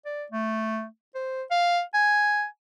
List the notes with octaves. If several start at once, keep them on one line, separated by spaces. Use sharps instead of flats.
D5
A3
C5
F5
G#5